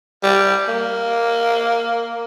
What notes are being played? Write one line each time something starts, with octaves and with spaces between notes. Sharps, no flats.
G3
A#3